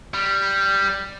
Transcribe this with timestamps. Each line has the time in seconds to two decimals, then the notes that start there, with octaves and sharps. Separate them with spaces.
0.14 G3